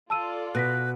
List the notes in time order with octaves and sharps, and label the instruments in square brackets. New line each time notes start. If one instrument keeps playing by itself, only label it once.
[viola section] F4 A4 D5 [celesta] A5 E6 D#7
[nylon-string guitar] B2 [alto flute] B4 [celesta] F#6 A#6 B6